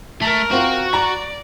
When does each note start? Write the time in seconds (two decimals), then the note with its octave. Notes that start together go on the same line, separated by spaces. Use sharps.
0.22 A3 A#4
0.52 C4 F4 F#4
0.93 D5 A#5 A#6